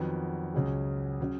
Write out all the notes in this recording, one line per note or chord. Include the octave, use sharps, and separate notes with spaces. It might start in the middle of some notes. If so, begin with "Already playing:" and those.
Already playing: F2 D#3 F#3 B3
C#2 C#3 F#3 C#4 G#4
C#3 F#3 C#4